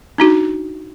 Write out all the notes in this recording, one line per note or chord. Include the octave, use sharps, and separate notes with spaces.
D4 D#4 F#4